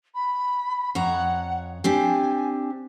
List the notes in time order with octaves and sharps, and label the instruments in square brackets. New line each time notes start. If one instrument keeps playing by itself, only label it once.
[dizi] B5
[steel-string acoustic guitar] F2 C#5 A#5 [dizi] F#5
[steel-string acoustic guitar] C4 D4 G4 [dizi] G#5